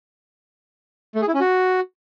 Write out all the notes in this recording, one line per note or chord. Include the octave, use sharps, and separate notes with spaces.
A3
G#4
E4
C#4
F#4